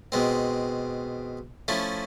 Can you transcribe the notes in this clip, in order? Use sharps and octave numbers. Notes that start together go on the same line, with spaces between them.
B2 G#3 C4
F3 A3 C#4 E4